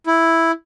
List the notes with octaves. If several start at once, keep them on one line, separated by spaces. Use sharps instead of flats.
E4